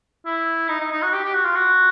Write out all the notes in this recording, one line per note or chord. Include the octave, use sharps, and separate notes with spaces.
E4
D#4
D#4
D#4
F#4
G4
G4
F#4
F4
F#4